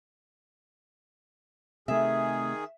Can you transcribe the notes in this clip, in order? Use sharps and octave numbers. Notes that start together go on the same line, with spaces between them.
C3 D#3 A3 G#4 E5